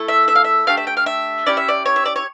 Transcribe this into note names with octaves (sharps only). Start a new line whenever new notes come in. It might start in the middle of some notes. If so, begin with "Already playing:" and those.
Already playing: A3 E4 A4
E5
E5
F5
E5
A3 D4 G4 F5
E5
G5
F5
E5
C#4 E4 G4 D5
E5
D5
C#5
E5
D5
C#5